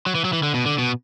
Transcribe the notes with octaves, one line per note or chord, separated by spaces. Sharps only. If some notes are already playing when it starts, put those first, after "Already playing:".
F#3
E3
F#3
E3
D3
B2
D3
B2